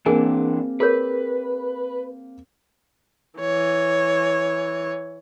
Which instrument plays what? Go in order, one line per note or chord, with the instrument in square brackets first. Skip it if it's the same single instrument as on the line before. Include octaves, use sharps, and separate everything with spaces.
[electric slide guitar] E3 D4 [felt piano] A#3 C4 [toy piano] G#4 A#4 G#5
[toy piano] G#4 A#4 C#5 [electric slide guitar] B4
[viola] E3 C#5